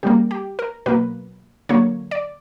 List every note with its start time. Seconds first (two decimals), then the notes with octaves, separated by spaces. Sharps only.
0.03 C#3 G3 A#3 G4
0.31 G4
0.59 A#4
0.86 B2 F#3 A#3 B4
1.69 D3 F#3 A#3 C#5
2.11 D5